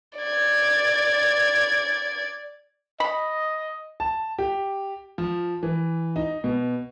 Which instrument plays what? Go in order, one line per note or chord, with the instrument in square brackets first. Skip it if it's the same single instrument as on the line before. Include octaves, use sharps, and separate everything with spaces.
[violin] D5 G#6
[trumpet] D#5 [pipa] B5
[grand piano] A5
G4
F3
E3
D#4
B2